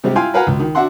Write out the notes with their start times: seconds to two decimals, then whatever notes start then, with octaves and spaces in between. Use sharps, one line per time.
0.04 C3 G3 G#3 C4 G4
0.15 E4 F4 F5 G5 G#5 C6
0.34 A#4 B4 F5 F#5 G#5 A#5
0.47 C#2
0.59 D#3
0.75 D4 F#4 E5 F#5 C6